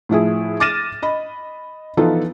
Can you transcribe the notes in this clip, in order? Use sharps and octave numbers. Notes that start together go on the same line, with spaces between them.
A2 F3 E4 G#4
D6 F6 A6 A#6 D#7 E7
D#5 B5
E3 F3 B3 D#4 F4 A4